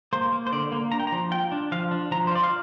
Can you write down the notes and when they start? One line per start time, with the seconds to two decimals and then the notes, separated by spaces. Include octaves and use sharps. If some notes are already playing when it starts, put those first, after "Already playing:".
0.13 A#3 C5
0.32 A#3
0.47 C5
0.52 D3 D5
0.72 A#3
0.92 D4 A#5
1.00 G5
1.07 A#5
1.12 F3
1.31 F4 G5
1.52 D4
1.72 F3 F5
1.91 D4
2.11 F3 A#5
2.27 C5
2.31 F4 D5
2.43 F5